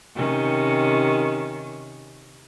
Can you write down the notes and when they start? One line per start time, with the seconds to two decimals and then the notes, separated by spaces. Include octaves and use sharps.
0.15 C3 D#3 C#4